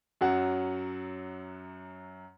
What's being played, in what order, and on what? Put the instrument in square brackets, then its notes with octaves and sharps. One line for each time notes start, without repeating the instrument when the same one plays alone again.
[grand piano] F#2 F#3 F#5